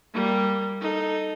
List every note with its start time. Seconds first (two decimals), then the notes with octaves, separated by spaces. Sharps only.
0.14 G3 A#3
0.81 D#4 A4